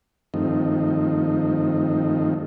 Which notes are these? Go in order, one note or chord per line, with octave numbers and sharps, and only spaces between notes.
G2 D#3 F3 A3 C4 D#4